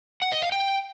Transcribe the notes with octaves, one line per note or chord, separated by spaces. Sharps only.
F#5
D#5
F5
G5